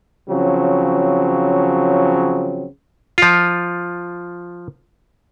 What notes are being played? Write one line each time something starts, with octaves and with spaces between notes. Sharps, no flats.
C#3 F3 F#3 C4
F3 F4